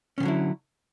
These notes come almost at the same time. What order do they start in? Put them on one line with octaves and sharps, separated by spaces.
C#4 D#3 D3 F#3 E4